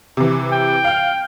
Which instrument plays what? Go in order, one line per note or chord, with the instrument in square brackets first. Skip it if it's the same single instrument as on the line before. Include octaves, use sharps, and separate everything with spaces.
[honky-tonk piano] C3 E3
[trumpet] G5
[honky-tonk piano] F5 F6